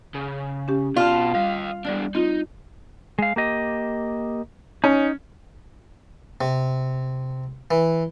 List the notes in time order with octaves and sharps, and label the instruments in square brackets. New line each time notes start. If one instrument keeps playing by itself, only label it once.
[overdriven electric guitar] C#3
[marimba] C#4 G4
[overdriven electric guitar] B2 A5 [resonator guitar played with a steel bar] F4 [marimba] D5
[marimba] G3 [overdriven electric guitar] D#5 F5
[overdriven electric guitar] E2 D4 [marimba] G3 D5 F6
[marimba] C4 F4 [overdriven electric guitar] D#4
[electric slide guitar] G#3 F5
A#3 G4 D#5
[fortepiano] C#4 [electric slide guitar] D#4
[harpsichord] C3
E3